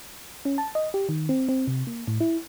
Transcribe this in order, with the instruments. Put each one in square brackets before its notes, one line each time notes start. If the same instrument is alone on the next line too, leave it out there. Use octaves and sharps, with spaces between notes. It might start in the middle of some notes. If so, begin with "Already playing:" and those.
[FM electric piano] C#4
A5
D#5
G4
D#3
C4
C4
C3
A#3
A2
E4